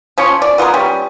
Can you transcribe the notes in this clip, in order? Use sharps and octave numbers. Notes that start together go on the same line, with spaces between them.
F3 C#4 F4 C#5
D5
B3 F4 G#4 A#4
G3 C#4